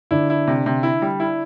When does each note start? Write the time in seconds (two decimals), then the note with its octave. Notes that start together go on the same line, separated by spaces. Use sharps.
0.11 D3 D4 E4
0.30 E4
0.47 C3
0.66 C3
0.83 E4
1.02 G3
1.20 E4